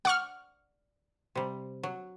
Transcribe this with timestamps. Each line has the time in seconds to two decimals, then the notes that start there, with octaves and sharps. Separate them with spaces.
0.05 D5 F#5 C#6 F6
1.35 C3 G3
1.83 F#3